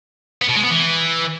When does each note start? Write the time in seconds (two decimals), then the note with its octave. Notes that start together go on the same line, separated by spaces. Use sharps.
0.42 B3
0.49 B2
0.56 G#3
0.63 B3
0.70 E3